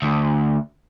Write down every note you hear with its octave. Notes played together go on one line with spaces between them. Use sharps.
D2